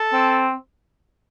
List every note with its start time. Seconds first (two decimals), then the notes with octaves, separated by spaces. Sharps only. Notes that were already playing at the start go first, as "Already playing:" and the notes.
Already playing: A4
0.13 C4